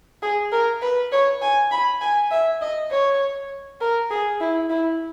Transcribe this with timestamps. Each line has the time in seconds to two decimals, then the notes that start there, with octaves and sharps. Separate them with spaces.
0.23 G#4
0.52 A#4
0.82 B4
1.12 C#5
1.42 G#5
1.71 B5
2.01 G#5
2.31 E5
2.61 D#5
2.91 C#5
3.81 A#4
4.10 G#4
4.41 E4
4.70 E4